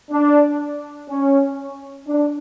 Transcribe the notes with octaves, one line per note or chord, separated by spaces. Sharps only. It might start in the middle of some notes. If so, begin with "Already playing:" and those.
D4
C#4
D4